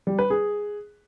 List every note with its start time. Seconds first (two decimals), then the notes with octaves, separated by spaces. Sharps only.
0.07 G3
0.19 B4
0.30 G#4